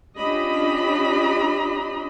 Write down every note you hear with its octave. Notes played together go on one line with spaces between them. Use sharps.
C#4 D4 F4 G4 D#5 B5